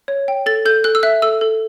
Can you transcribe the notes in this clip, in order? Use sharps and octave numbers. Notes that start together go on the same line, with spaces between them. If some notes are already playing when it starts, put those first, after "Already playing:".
C#5
G5
A4 A6
A4 G6
A4 F#6
E6
E5 F#6
A4 E6
A4